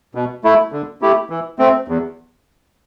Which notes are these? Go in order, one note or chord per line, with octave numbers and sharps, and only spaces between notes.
B2
A3 E4
D3
A3 E4 G4
E3
A3 C4
E2